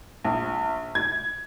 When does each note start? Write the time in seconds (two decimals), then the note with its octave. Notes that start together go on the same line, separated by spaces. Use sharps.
0.24 A#1
0.95 G#6